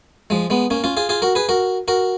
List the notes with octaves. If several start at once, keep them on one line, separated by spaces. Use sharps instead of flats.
F3 G#3
G#3 B3
A#3 C#4
C#4 F4
F4 G#4
F4 G#4
F#4 A#4
G#4 B4
F#4 A#4
F#4 A#4